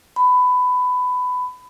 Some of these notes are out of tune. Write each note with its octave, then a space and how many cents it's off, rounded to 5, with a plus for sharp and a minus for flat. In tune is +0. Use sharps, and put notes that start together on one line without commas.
B5 +20